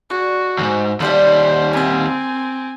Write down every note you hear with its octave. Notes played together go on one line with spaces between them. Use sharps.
G#3 D4 F#4
D#2 G#2
D#2 G3 A4 C5 D5 A5
C4 A#4 G#5 A5